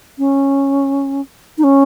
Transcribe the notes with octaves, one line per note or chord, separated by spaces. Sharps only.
C#4
D#4
C#4